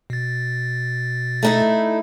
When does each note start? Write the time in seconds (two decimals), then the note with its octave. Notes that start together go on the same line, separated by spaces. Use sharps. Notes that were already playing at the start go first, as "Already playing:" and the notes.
0.10 B2 A6
1.43 A3 D#4 E4